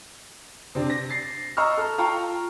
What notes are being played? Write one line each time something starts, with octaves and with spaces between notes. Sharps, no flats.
C3 C4 D4
A#6
A6 C7
D#5 A#5 C#6 E6 F6
A4 F6
F4 F5 G5 A5 A#5 C#6